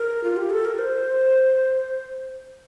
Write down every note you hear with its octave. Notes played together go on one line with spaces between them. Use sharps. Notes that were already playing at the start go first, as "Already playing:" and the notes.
Already playing: A#4
F4
G4
A4
A#4
C5